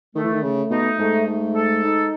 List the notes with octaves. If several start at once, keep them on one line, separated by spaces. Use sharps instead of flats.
D#3 A3
E3
D#3
C#3 A3
B2 D#4
G#2 A3
A3
A4
D#4